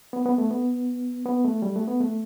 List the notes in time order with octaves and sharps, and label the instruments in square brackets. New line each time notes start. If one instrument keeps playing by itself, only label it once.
[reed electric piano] B3
B3
A3
B3
B3
A3
G3
A3
B3
A3